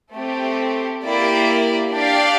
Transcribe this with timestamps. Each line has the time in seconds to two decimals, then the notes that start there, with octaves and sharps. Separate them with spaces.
0.14 A3 C4 G4
1.04 A#3 E4 G4 D5
1.93 D4 G4 D5 F5